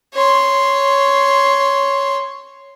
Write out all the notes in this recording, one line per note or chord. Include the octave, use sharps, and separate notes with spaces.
C#5 C6